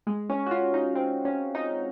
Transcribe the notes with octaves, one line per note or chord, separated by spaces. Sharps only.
G#3
C#4
F#4
F4
D#4
C4
C#4
D#4